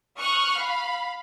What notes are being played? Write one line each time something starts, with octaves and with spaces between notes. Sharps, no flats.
C#6 D#6 F6 F#6
F5 B5